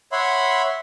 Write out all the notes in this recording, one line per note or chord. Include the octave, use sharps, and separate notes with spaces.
C#5 E5 F#5 B5 C6